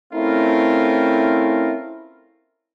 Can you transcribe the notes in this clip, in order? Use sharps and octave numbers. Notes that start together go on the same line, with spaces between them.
A3 C4 C#4 E4 F4 A#4